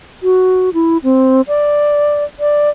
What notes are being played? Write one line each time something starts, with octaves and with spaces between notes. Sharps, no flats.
F#4
E4
C4
D5
D5